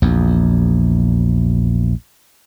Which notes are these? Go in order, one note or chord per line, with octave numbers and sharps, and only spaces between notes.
A#1 E2